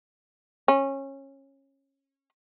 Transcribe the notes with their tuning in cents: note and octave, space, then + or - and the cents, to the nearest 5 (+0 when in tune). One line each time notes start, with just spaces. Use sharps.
C#4 -20